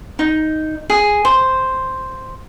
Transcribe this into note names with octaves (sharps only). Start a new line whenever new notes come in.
D#4
G#4
C5